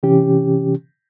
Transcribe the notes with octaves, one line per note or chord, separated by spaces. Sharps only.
C3 E3 C#4 G4